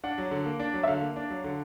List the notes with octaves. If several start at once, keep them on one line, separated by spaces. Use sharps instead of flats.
D4 F#5
F#3
D3
A#3
D4
F#3
E5
D3 F5
A#3
D4
F#3
D3